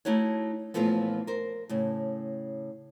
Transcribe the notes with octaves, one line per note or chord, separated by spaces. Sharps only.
A3 D#4 E4 F#4 C#5
D#2 A#2 E3 F3 A3 B3
A#4 C5
A2 C#3